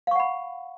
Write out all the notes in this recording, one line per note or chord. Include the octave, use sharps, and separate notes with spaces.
F5 F#5 B5 C#6